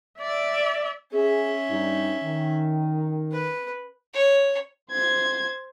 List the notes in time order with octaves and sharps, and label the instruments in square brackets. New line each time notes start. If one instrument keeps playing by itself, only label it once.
[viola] D5 E5
[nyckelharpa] C#4 E5 [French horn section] G#4
[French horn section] G2 D#4
D#3
[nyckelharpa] B4
[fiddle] C#5
[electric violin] C5 G#6